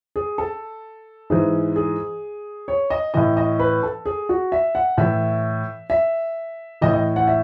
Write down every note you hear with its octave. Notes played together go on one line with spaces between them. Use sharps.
G#4
A4
G#2 E3 G#4
G#4
C#5
D#5
A2 E3 D#5
D#5
B4
A4
G#4
F#4
E5
F#5
A2 E3 E5
E5
A2 E3 D#5
D#5
F#5
E5